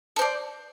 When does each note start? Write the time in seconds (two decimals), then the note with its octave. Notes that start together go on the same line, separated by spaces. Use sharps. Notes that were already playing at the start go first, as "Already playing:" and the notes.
0.16 A4
0.19 C5
0.22 D5